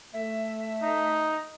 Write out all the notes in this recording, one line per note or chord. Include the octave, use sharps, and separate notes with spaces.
A3 E5
D#4